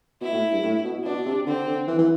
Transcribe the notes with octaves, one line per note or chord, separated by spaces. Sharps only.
B2 E4
A2
G2
A2
B2
B2 D4
C3
D3 C4
D3
E3
E3